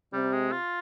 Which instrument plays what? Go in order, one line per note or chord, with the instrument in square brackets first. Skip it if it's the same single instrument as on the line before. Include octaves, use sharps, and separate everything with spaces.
[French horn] C3 [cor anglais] G3
[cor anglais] G#3
F4